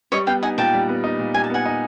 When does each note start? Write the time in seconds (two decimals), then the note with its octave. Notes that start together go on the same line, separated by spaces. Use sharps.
0.12 G3 C#5 D#5
0.27 B3 F5 G5
0.43 D#4 F#5 G#5
0.58 A#2 G5 A5
0.73 G3
0.89 B3
1.04 D#4
1.19 A#2
1.34 G3 G#5
1.44 A5
1.50 B3 F#5 G#5
1.65 D#4